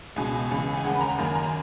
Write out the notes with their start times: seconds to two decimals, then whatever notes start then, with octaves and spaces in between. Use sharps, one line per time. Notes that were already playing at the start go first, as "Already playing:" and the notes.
0.16 C#2 B2 G#3 G#5
0.51 C#2 C#3 E3
0.77 G#5
0.84 D#2 C#3 G#3 F#5
0.94 B5
1.01 A#5
1.18 F#2 D#3 A#3
1.25 G#5
1.35 A#5